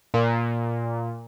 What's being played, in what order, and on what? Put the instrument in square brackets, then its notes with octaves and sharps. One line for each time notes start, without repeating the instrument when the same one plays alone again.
[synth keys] A#2